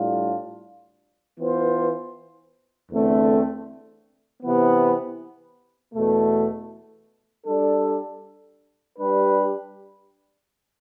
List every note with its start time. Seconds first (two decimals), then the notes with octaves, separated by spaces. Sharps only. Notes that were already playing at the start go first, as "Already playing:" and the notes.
Already playing: A2 G3 D4 F4
1.38 E3 B3 F4 C5
2.90 E2 D3 A3 C4
4.42 C3 E3 B3
5.94 E2 B2 A3
7.47 G3 D4 A4
8.98 G3 D4 G4 B4